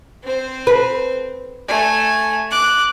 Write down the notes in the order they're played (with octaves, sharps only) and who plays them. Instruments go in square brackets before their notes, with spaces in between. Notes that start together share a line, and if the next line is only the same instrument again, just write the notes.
[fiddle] C4 C5
[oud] B4
[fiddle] A3 G#5
D6 F#6